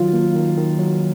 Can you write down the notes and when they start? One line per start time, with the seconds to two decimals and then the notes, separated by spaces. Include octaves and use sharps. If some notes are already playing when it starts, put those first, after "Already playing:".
Already playing: D#3 F#3 F4
0.13 A#3
0.35 D#3
0.57 D#3
0.79 F#3